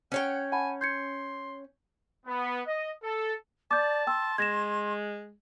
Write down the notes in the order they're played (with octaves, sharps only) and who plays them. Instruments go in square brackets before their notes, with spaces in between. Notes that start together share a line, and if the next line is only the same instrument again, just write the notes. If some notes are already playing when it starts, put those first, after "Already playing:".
[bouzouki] C#4 C#5 G5 [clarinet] F#5
[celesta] F#5 A5 B5 [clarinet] G#5
[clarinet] C6 [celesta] G6 G#6 C#7
[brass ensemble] B3
D#5
A4
[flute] D5 [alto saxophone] A5 [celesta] D6 G6
[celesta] G5 E6 [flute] C6
[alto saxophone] G#3 [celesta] G#6 A#6 E7